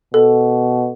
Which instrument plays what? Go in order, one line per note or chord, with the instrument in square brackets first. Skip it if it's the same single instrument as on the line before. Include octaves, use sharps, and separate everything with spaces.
[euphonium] B2 [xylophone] A4